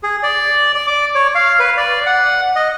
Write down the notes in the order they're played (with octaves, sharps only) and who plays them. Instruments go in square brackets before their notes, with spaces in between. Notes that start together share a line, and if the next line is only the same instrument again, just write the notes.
[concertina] G#4
D5
D5
D6
C#5
F5
B4
D5
F#5
D#5